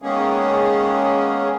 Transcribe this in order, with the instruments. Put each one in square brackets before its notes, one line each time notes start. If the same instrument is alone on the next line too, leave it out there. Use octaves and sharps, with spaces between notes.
[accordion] D#3 G#3 A#3 B3 C#4 G#4